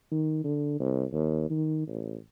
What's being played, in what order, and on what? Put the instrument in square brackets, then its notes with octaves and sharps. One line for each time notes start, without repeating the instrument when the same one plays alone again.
[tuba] D#3
D3
C2
D#2
D#3
A1